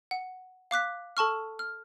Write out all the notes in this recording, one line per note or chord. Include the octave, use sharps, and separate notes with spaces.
F#5
F5 D6 F#6 B6
A4 A5 C#6 F6
F6